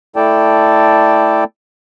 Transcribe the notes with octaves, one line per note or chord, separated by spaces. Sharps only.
A3 E4 A4 D5 G5 A5